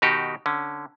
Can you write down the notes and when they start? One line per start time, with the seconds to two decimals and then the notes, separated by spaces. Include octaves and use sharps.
0.02 B2 D#3 D#4 F#4 G4
0.46 D3 C#4